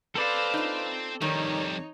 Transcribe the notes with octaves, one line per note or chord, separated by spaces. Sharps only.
C4 A4 B4 C5 D5 F5
D#4 F4
F2 D#3 G3 D#4 C#5